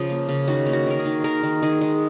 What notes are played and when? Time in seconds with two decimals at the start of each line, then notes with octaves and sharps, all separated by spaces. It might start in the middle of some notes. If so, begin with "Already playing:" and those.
Already playing: C#3 F3 G#4
0.10 A#3
0.29 C#3
0.47 D#3 F#4
0.66 A#3
0.73 F#4
0.86 D#3 A#4
0.99 G#4
1.05 D#3
1.24 D#3 A#4
1.43 D#3
1.62 D#3 G#4
1.81 G#3